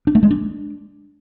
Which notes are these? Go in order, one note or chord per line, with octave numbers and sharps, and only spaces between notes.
D4
A3
G#3
D4